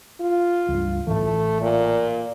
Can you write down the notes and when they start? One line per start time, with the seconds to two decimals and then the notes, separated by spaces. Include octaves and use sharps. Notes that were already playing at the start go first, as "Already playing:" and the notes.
0.20 F4
0.68 C#2 G2
1.07 A1 A2 E3 A3
1.61 A#2